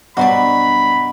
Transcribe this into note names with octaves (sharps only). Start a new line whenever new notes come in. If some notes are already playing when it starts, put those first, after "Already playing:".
G2 B2 F#3 C5 D5 B5